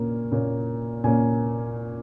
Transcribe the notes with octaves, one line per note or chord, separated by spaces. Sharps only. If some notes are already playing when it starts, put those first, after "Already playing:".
Already playing: A#2 A#3 C#4
A#2 A#3 C#4
A#2 A#3 C#4 G#5